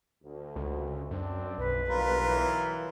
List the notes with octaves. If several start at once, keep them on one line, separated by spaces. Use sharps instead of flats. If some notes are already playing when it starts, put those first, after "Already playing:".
D2
C#2
F#2 C4 D4
B1 B4
D#2 D3 G3 F4 A#4
E3 F#3